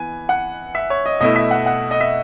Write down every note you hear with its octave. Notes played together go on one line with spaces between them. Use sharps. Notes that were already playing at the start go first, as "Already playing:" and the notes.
Already playing: E3 B3 G#5
F#5
E5
C#5
D#5
B2 A3 E4 D#5
E5
F#5
F#5
D#5
E5